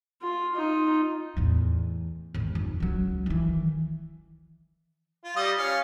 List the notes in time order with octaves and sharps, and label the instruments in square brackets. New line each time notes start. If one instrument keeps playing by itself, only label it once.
[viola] F4
D#4 F4
[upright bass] E2 A2
G#1 D#2
F1
C#2 F#3
D#3 E3
[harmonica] F4
G3 D#5
C#4 F5